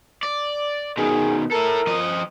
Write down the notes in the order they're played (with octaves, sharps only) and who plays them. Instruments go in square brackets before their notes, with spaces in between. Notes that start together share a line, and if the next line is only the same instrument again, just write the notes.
[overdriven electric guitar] D5
[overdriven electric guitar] B2 D#3 [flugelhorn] G#4
[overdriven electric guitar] E4 A4 [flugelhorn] A#4
[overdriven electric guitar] F3 D#5